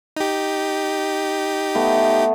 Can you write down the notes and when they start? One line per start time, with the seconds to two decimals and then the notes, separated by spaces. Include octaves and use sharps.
0.17 D#4 G4
1.75 A3 B3